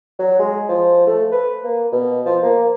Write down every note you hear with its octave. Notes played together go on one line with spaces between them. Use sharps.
F#3
G#3
F3
A3
B4
A#3
B2
F3
A#3